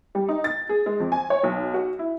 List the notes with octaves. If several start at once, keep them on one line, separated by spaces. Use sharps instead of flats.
G3
D#4
A6
G#4
G#3
F2
G#5
C#5
B1
F#4
E4